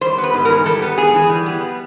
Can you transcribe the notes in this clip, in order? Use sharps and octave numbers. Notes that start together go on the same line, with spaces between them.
G3 C5
B3
B4
G#2
A#4
E3
G3 A4
B3
G#2 G#4
E3
G3
B3